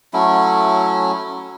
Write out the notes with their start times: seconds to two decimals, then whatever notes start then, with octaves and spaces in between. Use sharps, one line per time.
0.13 F#3 A3 C#4 E4